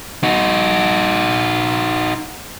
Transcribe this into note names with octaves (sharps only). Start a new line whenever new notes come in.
D#4 F#4